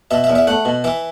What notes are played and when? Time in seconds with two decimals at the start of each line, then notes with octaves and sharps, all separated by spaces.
0.11 B2 E5
0.24 E5
0.30 E2
0.35 E5
0.47 A3 F#5
0.65 B2
0.84 E3 E5